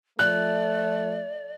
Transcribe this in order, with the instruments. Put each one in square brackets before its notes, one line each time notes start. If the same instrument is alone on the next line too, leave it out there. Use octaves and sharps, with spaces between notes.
[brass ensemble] F3 A3 [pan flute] D5 [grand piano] F#6